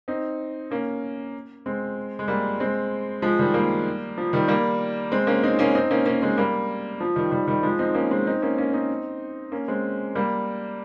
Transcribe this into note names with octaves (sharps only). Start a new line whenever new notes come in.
C4 D#4
A#3 C#4
G#3 C4
G#3
G3 A#3
G#3 C4
F3 G#3
D#3 G3
G3 A#3
F3
D#3 G3
G3 A#3
G#3 C4
A#3 C#4
C4 D#4
A#3 C#4
C4 D#4
A#3 C#4
A#3 C#4
G#3 C4
G3 A#3
F3
D#3 G3
D#3 G3
D#3 G3
F3 G#3
C4 D#4
A#3 C#4
G#3 C4
C4 D#4
A#3 C#4
A#3 C#4
C4 D#4
A#3 C#4
G#3 C4
G3 A#3